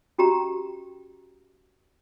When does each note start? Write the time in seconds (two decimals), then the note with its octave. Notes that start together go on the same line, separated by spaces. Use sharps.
0.18 C#4 F#4 G4 G5 A#5